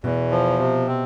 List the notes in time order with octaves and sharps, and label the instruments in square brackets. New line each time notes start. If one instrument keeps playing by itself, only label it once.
[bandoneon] E2 [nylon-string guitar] B2
[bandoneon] F3
C3
C4